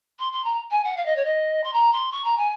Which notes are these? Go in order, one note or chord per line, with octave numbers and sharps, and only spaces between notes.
C6
C6
A#5
G#5
F#5
F5
D#5
C#5
D#5
C6
A#5
C6
C#6
A#5
G#5